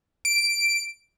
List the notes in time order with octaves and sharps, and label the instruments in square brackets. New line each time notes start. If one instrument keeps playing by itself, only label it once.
[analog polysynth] D7